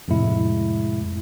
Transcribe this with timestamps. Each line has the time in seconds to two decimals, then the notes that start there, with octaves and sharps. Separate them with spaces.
0.08 F2 A2 C3 G#3 E4